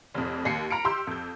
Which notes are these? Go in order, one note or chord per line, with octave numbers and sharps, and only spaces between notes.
F1 F2
D#2 C7 C#7
A#5 B5 F6 C#7 D7
G4 C6 E6 G6
F2 G6